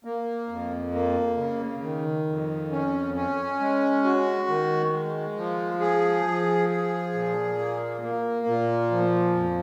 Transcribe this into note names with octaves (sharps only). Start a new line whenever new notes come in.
A#3
F2
A#3
C#3
D#3
F2
C#4
C#4
G#3
F#4
D#3
G#3
F3
G#4
F3
G#4
A#2
A#3
A#3
A#2
F3
F2